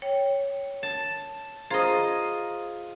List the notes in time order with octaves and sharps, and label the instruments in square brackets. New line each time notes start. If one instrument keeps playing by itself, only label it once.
[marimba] C#5 G5
[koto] A5
[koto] F4 D#5 [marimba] G#4 C5 A#5